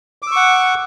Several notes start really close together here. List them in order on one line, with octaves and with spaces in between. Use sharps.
D6 E6 C#6 F#5